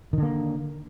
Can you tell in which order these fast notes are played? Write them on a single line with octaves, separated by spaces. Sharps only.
D#3 D3 A#3